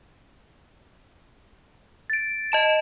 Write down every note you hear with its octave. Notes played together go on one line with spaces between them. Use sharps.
A6 D7
D#5 A5 E7